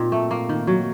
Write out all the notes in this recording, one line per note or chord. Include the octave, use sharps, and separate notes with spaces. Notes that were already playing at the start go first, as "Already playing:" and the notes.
Already playing: A#2 C4 D#4
A3
A#3
D#3
F#3